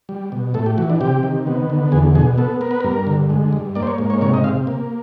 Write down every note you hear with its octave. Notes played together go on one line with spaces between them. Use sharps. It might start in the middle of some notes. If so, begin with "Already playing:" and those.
G3
B2
A2 A4
G4
E3 F#4
D4
C3 G4
D#3
B3
D3
E2 G#4
B2 G#4
B3 A4
B3 A#4
B4
G2 A#4
D3
G#3
G2
A#3 D5
C5
C#5
G#2
C#5
C3 C#5
D#5
C3 F5
A#3